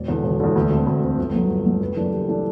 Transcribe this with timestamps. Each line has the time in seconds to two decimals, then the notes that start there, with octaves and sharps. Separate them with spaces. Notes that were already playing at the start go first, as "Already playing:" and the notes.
Already playing: E1 D5
0.08 E2 D3
0.23 E1
0.40 E2 D3
0.56 D2
0.70 D3 A3 C4
0.86 D2
1.02 D3 A3 C4
1.18 G1
1.33 G2 F#3 A3
1.50 G1
1.66 G2 F#3 A3
1.80 F#1 B4
1.96 F#2 E3 A3 D4
2.12 F#1 G4
2.29 E3 A3 D4